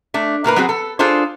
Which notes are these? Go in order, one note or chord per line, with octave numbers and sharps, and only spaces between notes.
A3 D4
A2 A#3 A#4 B4
F#3 B3 C4 F#4 G#4
A4
D4 F4 G#4 A4 C5